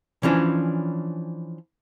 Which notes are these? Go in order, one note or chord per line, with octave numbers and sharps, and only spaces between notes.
E3 F3 C#4 D4